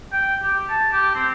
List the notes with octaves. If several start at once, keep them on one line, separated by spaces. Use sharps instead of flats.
G5
G4
A5
G4
C4